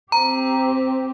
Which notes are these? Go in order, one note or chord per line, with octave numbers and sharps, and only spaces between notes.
C4 G4 A#5